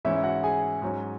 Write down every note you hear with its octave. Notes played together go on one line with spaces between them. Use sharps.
G#2 E3 C#4 E4 E5
E5
F#4 F#5
G#4 G#5
G#2 F#3 C#4